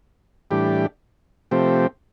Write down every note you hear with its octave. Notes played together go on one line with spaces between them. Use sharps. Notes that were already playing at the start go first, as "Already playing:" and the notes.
A2 E3 G3 D4 G4
C3 F3 A3 C4 G4